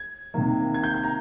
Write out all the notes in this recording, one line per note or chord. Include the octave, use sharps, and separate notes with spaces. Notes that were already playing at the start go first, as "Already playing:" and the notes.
Already playing: G#6
C3 D#3 A#3
G#6
G6
G6
A#5